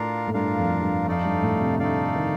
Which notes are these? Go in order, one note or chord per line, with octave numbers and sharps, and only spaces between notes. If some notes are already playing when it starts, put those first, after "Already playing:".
Already playing: A2 D4 F4 A#4 F5
A2
G2 D4 F4 A#4 F5
F2
G2
F2 A3 D#4 A4 D5 F5
G2
A2
C3
D3 A3 D#4 A4 D5 F5
D#3